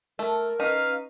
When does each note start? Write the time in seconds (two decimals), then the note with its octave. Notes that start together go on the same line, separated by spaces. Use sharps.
0.19 A3 A#4
0.60 C#4 D#4 B4 D#5 F5